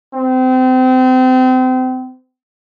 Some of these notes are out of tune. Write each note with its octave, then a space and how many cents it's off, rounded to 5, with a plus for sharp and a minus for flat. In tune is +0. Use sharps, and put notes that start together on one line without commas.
C4 -30